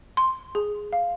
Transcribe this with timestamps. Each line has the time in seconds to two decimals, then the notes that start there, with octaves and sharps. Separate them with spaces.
0.17 C6
0.55 G#4
0.93 F5